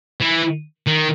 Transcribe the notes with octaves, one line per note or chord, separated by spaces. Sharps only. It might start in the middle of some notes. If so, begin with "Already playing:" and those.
E3
D#3